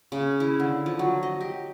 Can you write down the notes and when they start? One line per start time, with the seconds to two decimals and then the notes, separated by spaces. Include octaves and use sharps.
0.12 C#3
0.40 E4
0.60 D3
0.86 F3
0.99 F#3
1.23 D#5
1.41 G4